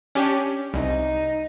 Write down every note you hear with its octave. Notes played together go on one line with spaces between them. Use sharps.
C#4 D4 G4
C2 D#4